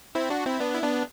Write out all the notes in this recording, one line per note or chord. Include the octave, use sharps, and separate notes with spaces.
C4 E4
D4 F#4
C4 E4
B3 D4
E4
B3 D4